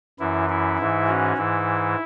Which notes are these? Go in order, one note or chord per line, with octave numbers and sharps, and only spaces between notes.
F#2 E3 E4
E4
G#2 E3
C#4 F#4
G#2 E3 E4